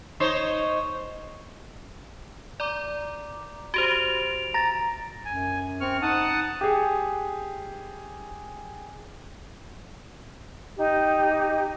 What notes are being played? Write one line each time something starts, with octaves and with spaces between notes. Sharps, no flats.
D#4 C5 C#5
D5 A#5 D6
F#4 G4 C5 D7 F7
A#5 A6 A#6
F#2 G#5
C4 C#6 F6
D#4 F#5 A5 D#6
G4 G#4
D#4 G4